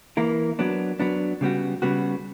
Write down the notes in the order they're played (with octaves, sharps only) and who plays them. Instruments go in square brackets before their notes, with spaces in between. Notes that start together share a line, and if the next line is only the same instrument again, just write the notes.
[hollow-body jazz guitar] E3 A#3 E4 A#4
F#3 B3 D4
F#3 B3 D4
C#3 G3 B3 F#4
C#3 G3 B3 F#4